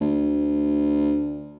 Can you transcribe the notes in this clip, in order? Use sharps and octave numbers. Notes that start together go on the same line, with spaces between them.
D2